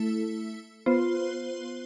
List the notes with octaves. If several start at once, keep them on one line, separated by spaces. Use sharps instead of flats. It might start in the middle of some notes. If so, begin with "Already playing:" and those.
Already playing: A3 E4 A4
B3 F4 C5